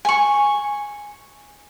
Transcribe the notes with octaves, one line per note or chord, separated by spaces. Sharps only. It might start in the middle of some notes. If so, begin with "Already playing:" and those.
G#5 C#6